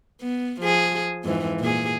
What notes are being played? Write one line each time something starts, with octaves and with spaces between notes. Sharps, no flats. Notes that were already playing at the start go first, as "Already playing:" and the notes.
B3
F3 G#4
F2 G#2 E3
A#2 G#4